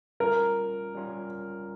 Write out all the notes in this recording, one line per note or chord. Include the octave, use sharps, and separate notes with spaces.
G3 C#4 F4 A#4
G3 C#4 F4